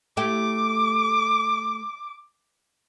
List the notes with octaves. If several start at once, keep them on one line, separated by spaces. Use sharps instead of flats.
A3 E4 G4 D6